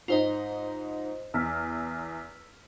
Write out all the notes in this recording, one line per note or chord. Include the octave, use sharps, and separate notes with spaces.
G#2 D#4 F4 C5 D#5
E2 E6 F6 B6